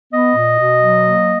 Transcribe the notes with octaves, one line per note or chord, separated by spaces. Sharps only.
B3 D#5
A#2
B2
F#3
A#3